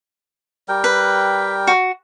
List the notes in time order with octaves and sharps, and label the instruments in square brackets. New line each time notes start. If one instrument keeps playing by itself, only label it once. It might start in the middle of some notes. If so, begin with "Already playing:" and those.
[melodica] G3 A#4 G5
[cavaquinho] B4
F#4